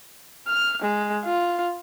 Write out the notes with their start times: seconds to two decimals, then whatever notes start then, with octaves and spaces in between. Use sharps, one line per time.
0.47 F6
0.82 G#3
1.25 F4